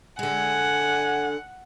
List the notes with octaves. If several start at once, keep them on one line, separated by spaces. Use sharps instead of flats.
D3 G#3 F#5 G#5